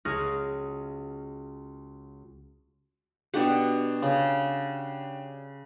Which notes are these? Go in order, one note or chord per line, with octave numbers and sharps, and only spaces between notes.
C#2 F#4 G#4 F6 A#6
B2 D4 F#4 G4 F#5
C#3